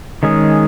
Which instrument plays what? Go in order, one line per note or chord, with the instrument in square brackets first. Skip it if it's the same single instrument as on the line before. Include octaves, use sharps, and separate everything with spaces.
[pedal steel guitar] D#3 G#3 C#4 G#4